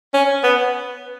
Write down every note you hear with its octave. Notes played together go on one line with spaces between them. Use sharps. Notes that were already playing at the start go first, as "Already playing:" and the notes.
C#4
B3